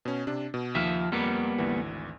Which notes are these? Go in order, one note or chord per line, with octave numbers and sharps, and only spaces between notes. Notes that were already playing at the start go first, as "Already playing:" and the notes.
B2 C#4
C3 D4
B2
D#2 F3 E5 F6
F2 G3 A#3 B3
G#1 D2 E3